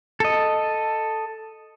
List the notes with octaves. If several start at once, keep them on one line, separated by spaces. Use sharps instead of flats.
A4 D#5